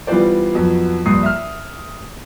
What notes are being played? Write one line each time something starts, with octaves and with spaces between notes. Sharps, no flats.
E3 G3 B3 F4 C5 D5
F2 F#3 B3
A#1 G2 A#5 D#6 C7
E5 F6